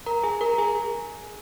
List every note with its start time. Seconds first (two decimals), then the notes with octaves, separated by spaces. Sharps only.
0.06 A#4 A#5
0.23 G#4 G#5
0.41 A#4 A#5
0.53 A#5
0.58 G#4 G#5